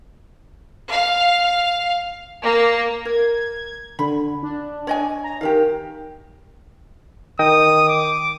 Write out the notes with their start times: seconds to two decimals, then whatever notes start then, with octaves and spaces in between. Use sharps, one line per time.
0.90 F5
2.43 A#3
3.05 A#4 G#6
3.99 D3 B5
4.43 D4
4.87 C#5 D#5 G#5
5.24 A#5
5.41 D#3 G4 A#4 F5
7.39 D#3 D#5 G5 D#6
7.88 D6